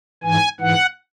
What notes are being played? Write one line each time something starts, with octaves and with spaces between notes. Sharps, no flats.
G#2 E3 G#5
G#2 E3 F#5